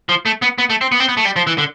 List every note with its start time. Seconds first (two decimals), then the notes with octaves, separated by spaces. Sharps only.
0.09 F3
0.26 A3
0.42 B3
0.58 B3
0.70 A3
0.81 C4
0.92 B3
1.00 C4
1.09 B3
1.17 A3
1.25 G3
1.36 F3
1.47 E3
1.58 D3